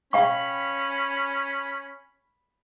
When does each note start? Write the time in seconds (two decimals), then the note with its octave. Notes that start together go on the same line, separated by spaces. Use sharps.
0.13 C#4 F5 G5 B5 C#6